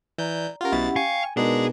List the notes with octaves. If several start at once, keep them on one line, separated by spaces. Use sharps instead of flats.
E3 D5 A#5 G6
C#4 F4 G4 A#4 F#5
B1 B2 E4 A6
F5 G5 G#5 C#6
B2 G#3 B3 D4 D#4 G#4 A#4 B4